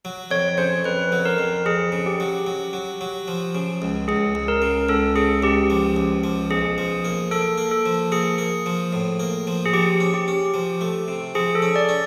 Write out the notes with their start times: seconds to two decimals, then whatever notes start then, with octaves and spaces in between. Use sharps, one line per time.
0.05 F#3
0.31 F2 C#5
0.58 C#3 C5
0.85 F2 B4
1.12 F#3
1.25 A#4
1.38 F2
1.66 F2 G#4
1.92 C#3
2.06 G4
2.20 F#3
2.47 F#3
2.73 F#3
3.01 F#3
3.28 F3
3.55 C#3
3.82 C#2
4.08 C#2 G#4
4.35 C#2
4.48 A#4
4.62 C#3
4.89 C#2 A4
5.16 C#3 G#4
5.43 C#2 G4
5.70 F3
5.96 C#2
6.24 F3
6.51 B1 G#4
6.78 F3
7.05 A#3
7.31 A#3 A4
7.58 A#3
7.71 A4
7.86 F3
8.12 A#3 G#4
8.38 A#3
8.66 F3
8.93 A2
9.20 A#3
9.47 F3
9.66 G#4
9.73 F3 G4
10.00 C#4
10.14 G4
10.28 C#4
10.54 F3
10.81 A3
11.08 C3
11.35 F3 G#4
11.55 A4
11.62 C#4
11.76 D5
11.89 C#4